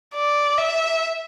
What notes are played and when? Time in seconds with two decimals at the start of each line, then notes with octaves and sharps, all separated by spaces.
0.15 D5
0.58 E5